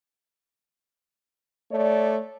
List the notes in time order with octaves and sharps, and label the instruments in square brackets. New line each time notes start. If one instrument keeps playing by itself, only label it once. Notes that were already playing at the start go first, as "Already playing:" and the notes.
[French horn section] A3 C#5 D5